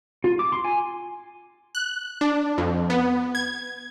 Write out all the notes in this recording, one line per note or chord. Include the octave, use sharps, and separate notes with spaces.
F4
D6
C6
G#5
F#6
D4
F2
B3
G#6